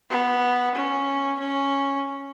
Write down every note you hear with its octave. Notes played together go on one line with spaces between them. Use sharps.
B3
C#4
C#4